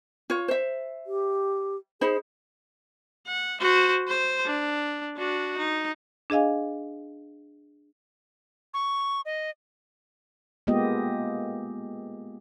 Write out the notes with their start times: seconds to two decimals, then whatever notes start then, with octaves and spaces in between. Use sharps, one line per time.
0.30 F4 C#5
0.48 C5 E5
1.06 G4
2.01 D#4 G#4 C5 B5
3.27 F#5
3.61 F#4 C5
4.08 C5
4.46 D4
5.18 D4 F#4
5.58 D#4
6.30 D4 G#4 D#5 F5 G#5
8.74 C#6
9.26 D#5
10.67 G#3 A#3 B3 F4 G4 D#5